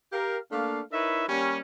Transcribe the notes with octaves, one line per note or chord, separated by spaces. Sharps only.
G4 A#4 F5
A3 A#3 D4 F5
D#4 E4 A#4 B4 C#5 E5
G3 A#3 C#4